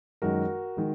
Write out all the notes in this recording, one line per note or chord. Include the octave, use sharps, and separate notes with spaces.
F#2 D#3 G#3 F#4 A#4
D#3 G#3